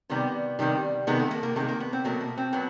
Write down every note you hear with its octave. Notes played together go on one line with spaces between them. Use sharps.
C3 D#3 G3 B3
C3 D#3 G3
C3 D#3 G#3 B3
A3
A#3
A#3
C3 D#3 G#3 A3
A#3
B3
C4
B2 F#3 A3 A#3
A#3
C4
B2 F#3 B3